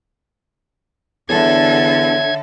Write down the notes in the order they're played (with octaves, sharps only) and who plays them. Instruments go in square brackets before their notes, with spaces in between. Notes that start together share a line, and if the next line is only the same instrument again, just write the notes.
[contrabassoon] E2 [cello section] D3 A4 [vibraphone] C#5 E5 [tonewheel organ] G#6